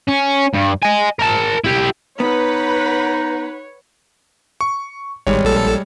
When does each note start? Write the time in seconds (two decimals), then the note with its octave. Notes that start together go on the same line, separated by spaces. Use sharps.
0.08 C#4
0.54 G2
0.82 D#5 G#5
1.19 A#4 A5
1.64 E4 G4
2.20 B3 D#4 B4 C#5 F#5 B5
4.61 C#6
5.27 G#1 G3 G#3 C#5
5.44 A#1 A4